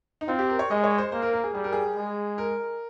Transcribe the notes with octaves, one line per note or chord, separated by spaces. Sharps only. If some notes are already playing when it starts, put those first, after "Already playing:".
D#4
C4 F4
G4
A#4
C#5
G#3 D#5
C#5
C5
A#3 C5
A#4
A#4
G#4
G3 G#4
A#4
G#4
G#3
A#4